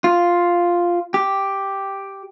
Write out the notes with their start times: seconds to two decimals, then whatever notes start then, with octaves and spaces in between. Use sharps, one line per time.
0.04 F4
1.14 G4